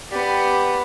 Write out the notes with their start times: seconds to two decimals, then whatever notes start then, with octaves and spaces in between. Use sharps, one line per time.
0.11 B3 G4 D5